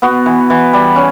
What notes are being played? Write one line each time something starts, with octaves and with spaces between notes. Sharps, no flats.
B3 F#4
E3
E3
G3
C#4